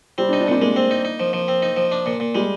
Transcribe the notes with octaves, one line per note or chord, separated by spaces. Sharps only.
G3 C4
D4
D#4
D4
A#2 C4
G#3 A#3
C4
D#4
D#4
F3
F3
C4
D#4
F3
D4
A#2
A#2
G3 G#3